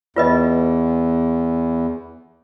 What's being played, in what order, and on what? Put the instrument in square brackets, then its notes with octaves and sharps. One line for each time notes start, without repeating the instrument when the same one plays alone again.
[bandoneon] E2 [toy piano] F4 B4 D#5